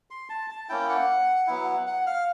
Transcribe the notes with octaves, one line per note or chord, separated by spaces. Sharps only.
C6
A5
A5
A#3 C#4 E4 G5
F#5
F#3 B3 E4
F#5
F5